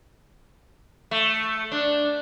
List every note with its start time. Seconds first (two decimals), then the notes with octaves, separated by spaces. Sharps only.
1.11 A3
1.72 D4